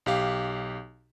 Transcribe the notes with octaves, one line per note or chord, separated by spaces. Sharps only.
B1 G4 F5